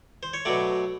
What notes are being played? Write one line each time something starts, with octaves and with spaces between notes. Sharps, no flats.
C5
C#5
B2 F#3 A3 D5